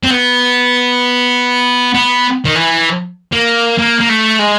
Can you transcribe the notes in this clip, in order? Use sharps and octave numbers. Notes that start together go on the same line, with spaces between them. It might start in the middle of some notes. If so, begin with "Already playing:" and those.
C4
B3
B3
D#3
E3
A#3
A#3
A#3
A3
G#3